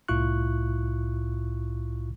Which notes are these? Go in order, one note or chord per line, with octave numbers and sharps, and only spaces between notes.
C2 A2 E4 F4 C#6 F#6